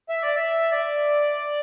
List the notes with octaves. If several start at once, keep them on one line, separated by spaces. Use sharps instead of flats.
E5
D5
E5
D5